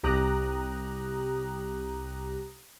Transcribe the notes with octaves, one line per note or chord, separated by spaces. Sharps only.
C2 G4 A#5 D#6 F#6